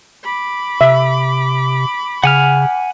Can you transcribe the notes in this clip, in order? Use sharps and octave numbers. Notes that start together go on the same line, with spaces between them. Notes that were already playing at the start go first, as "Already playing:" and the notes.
B5 D6
C3 E5
C#3 F#5 G#5 F6